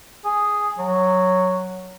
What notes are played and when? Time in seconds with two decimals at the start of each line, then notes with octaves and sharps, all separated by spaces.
0.25 G#4
0.79 F#3